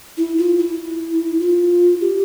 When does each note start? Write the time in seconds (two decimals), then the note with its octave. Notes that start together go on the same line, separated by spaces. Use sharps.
0.17 E4
0.38 F4
0.59 E4
1.39 F4
2.01 G4